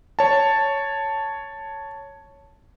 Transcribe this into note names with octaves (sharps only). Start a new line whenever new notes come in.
C#5 A5